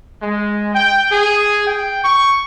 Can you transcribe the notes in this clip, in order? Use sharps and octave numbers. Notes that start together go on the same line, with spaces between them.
G#3
G5
G#4
G5
C#6